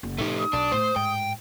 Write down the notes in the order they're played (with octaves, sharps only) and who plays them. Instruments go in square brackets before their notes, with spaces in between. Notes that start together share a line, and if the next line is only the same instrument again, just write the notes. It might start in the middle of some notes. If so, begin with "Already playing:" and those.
[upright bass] F#1
[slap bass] A2 C3 [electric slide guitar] A3 G4 [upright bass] D#4
[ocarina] D#6
[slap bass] B1 [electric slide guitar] D4
[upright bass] A2 [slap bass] A3 [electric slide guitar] C5
[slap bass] G#2 [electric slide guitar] G5